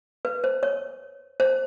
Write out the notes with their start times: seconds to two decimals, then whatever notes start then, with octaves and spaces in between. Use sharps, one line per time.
0.25 B4
0.44 C5
0.63 C#5
1.40 C5